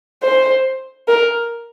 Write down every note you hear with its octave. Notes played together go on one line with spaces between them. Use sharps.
C5
A#4